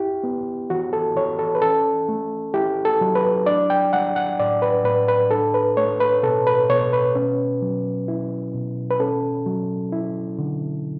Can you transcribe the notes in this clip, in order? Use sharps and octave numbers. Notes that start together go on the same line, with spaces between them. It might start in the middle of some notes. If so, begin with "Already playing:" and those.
Already playing: E4 G4
B3
E3 F#4
A4
E3 C#5
A4
B4
C#4 A4
A3
E4 G4
A4
F#3
B4
D4 D5
G5
G3 F#5
F#5
A2 D5
B4
A2 B4
B4
D4 A4
B4
A3 C#5
B4
B2 A4
B4
B2 C#5
B4
C#4
F#3
E4
B2
B4
C#4 A4
F#3
E4
D3